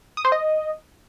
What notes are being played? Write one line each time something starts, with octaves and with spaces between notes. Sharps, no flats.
D#6
C5
D#5